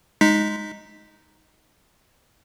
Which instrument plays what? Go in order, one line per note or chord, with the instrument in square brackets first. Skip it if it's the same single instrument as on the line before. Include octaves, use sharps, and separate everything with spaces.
[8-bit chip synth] G#3 D#4 B6